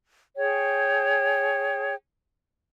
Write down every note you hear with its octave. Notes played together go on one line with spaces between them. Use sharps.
G#4 C#5 G5